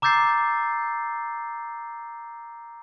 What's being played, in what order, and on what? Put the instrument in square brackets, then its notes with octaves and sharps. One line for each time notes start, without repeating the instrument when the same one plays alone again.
[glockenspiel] A#5 D6 E6 G6 A6 C7